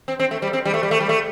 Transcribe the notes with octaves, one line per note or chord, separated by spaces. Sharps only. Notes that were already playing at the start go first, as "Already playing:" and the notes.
C4
C4
A3
G3
C4
G3
A3
G3
A3
G3
A3